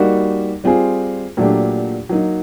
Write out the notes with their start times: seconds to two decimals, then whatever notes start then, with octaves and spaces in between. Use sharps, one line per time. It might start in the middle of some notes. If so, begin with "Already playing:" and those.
Already playing: G3 A#3 D#4 F#4
0.64 G3 C4 F4 G#4
1.37 A#2 F#3 A3 D4 G4
2.09 F#3 A#3 D#4